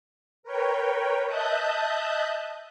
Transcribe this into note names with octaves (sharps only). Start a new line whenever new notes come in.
A#4 B4 C#5 G5
D#5 E5 A5 D#6 F#6 G6